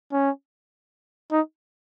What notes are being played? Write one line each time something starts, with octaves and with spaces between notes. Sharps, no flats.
C#4
D#4